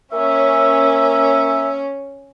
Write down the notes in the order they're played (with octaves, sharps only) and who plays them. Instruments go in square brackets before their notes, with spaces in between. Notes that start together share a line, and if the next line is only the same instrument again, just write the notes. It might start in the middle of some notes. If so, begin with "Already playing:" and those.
[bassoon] A#3 [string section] C#4 [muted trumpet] E5